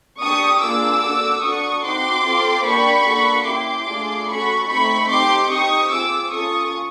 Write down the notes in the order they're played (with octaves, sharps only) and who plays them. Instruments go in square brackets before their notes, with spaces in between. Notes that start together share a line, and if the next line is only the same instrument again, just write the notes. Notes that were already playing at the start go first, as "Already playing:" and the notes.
[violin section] D4 C#6 D#6
G4
A#3 D4 F4 G#4 D6 E6
D4 F#4 A4
D4 F#4 A4 C#6 D#6
C4 D#4 F#4 C6 D6
C4 F4 A4
A#3 D4 G4 B5 C#6
A#3 D4 F#4 A4
C#4 E4 G4 C6 D6
A3 D4 F4 G#4
C#4 F#4 A4 B5 C#6
A3 C4 D#4 B5 C#6
C4 D#4 G4 C6 D6
C4 D#4 G4 C#6 D#6
C4 F4 G#4 D6 E6
C#4 F4 A4 C#6 D#6